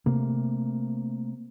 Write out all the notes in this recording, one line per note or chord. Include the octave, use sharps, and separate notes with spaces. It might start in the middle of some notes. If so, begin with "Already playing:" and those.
C3 A3 A#3